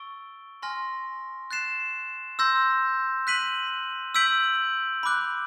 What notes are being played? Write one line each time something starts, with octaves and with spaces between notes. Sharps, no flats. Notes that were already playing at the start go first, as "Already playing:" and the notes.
Already playing: C#6 E6 A6 D7 G7
G#5 C6 F6 A#6
F#6 A6 C7 E7
C6 E6 G6 A#6
F#6 B6 D#7 F#7
E6 G6 B6 D7 F#7
B5 D6 F#6